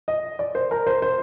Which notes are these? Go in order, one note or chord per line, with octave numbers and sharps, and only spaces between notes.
D#5
D5
C5
A#4
C5
C5